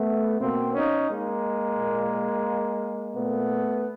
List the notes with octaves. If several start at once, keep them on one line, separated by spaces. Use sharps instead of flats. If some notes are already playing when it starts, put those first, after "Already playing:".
Already playing: A3 B3
B2 A#3 C4
C#4 D#4
G#3 A#3
A#2
A#2 A3 B3